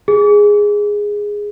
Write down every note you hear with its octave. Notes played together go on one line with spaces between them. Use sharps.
G#4